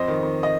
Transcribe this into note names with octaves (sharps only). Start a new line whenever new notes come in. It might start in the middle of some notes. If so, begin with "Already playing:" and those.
Already playing: F2 C5 D#5
D#3
D#3
D#5